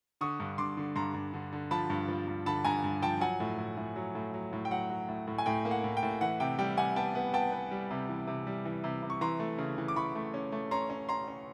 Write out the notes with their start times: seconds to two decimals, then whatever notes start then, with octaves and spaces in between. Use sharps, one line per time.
0.21 D3 C#6 D#6
0.40 G2
0.58 G2 C6 D6
0.77 D3
0.96 G2 A#5 C6
1.14 G2
1.33 D3
1.53 D3
1.71 F3 A5 B5
1.90 G2
2.09 F3
2.28 G2
2.46 D3 A5 B5
2.65 G2 G#5 A#5
2.84 G2
3.02 F3 G5 A5
3.21 F#3 F#5 G#5
3.40 A2
3.58 A2
3.77 A2
3.96 F#3
4.15 A2
4.34 F#3
4.53 A2
4.65 G5
4.71 F#3 F#5
4.90 F#3
5.09 A2
5.27 A2
5.38 G#5
5.46 A2 G5
5.65 A#3
5.71 F#5
5.84 A2
5.97 G5
6.03 A2
6.21 E3 F#5
6.40 C3 G5
6.59 G3 G5
6.77 C3 F#5 G#5
6.96 B3 G5 A5
7.15 B3
7.33 B3 G5 A5
7.52 B3
7.71 G3
7.91 C3
8.09 E3
8.27 C3
8.47 G3
8.65 E3
8.84 C3
9.03 C3
9.10 C#6
9.21 E3 A#5 C6
9.39 A3
9.58 C#3
9.78 E3
9.88 D6
9.96 E3 B5 C#6
10.15 A3
10.34 C#4
10.52 A3
10.71 C#4 A#5 C6
10.90 C#4
11.09 C#4 A#5 C6
11.28 C#4